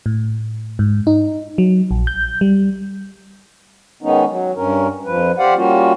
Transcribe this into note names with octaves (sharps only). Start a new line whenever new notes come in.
A2
G#2
D#4
F#3
A#1
G6
G3
D#3 G#3 B3 C#4 D#4
F#3
G2 C#4 A#4
F2 F3 B4
G4 C5 D5 F5 F#5
G3 A#3 C#4 F4 F#4